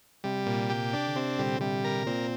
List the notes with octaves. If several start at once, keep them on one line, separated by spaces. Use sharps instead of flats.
C3 G3
A#2
G4
D4
D3
C3 C4
A#2 D3 G3
C3 G3
A#4
A#2 C4